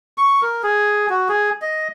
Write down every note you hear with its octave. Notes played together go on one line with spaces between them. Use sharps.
C#6
A#4
G#4
F#4
G#4
D#5